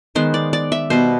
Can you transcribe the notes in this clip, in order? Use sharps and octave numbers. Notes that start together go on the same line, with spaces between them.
D#3 G#3 B3 C5
D5
D5
E5
B2 G3 B3 C5